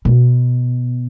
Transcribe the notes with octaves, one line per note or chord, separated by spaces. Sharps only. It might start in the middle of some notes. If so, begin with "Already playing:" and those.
B2